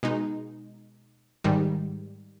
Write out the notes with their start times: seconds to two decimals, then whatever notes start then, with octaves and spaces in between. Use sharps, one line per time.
0.03 B2 G#3 D#4
1.44 G#2 D#3 G3